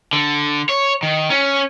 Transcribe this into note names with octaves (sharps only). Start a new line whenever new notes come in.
D3
C#5
D#3
C#4